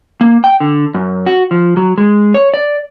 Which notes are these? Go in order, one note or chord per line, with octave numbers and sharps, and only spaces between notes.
A#3
G5
D3
F#2
F#4
F3
F#3
G#3
C#5
D5